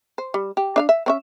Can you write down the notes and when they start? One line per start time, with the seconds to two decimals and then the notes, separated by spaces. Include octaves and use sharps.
0.18 C5
0.34 G3
0.57 G4
0.76 D4 E5 F5
0.89 E5
1.06 C4 C#4 E5